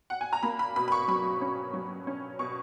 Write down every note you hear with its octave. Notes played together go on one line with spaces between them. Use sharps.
F#5
G#5
A#5
A#3 B5
B5
B2 B5
B5
C#6
F#3 B5
C#4
F#3
C#4
B2 C#6